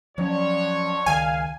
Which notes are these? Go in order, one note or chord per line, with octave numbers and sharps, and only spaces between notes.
F2 F3 F#3 C#4 D4 C#5
C#2 D#3 F5 G#5